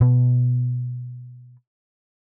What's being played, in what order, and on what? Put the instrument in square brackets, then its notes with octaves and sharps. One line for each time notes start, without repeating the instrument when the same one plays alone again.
[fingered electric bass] B2 B3